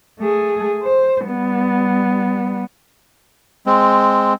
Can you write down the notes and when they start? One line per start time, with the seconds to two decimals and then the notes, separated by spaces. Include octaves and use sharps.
0.19 A3 G#4
0.83 C5
1.24 G3 B3
3.66 G#3 C4